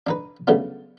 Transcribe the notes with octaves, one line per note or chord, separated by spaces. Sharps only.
D4 D#4 B4
C#3 F#3 G3 A3 B3 D4